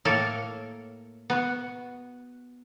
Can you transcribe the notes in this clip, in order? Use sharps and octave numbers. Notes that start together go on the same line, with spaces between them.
A2 A#3 A4 A#4 C#5
B3 F#4